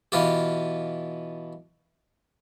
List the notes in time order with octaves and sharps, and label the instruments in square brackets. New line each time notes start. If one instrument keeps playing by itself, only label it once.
[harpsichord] B2 E3 F4 G4